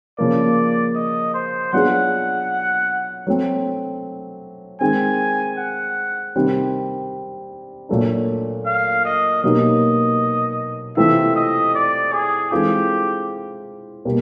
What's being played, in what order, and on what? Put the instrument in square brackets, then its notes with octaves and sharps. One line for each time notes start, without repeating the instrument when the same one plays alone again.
[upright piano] C#3 F3 A#3 [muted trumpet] D5
[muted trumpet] D#5
C5
[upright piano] F#3 B3 D4 F4 G#4 [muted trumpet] F#5
[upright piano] F#3 A3 C4
[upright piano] D#3 G#3 C4 [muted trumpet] G#5
[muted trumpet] F#5
[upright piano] C3 D#3 G3 C4
A#2 F#3 A3 D4
[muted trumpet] F5
D#5
[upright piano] B2 F#3 A#3 D#4 G4 [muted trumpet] D#5
[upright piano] C3 E3 A3 C4 F4 [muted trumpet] E5
[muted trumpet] D#5
D5
G#4
[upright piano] E3 G#3 C4 F4 A4 [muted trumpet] G4
[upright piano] B2 G3 A#3